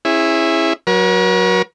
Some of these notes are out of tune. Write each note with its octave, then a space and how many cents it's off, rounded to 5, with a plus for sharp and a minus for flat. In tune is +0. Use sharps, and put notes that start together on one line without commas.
C#4 -30 E4 +5 G#4 -10
F#3 +0 A#4 +45 C#5 +0